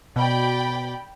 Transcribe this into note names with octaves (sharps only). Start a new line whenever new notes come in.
B2 D5 G5 B5